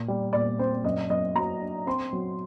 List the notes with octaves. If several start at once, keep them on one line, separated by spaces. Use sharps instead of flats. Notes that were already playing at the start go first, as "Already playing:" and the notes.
Already playing: A#2
G3
A#2 D5
C4 C5
F#2 D#5
F#2 D#5
F#3 A#5
D4
C4 C6
F#3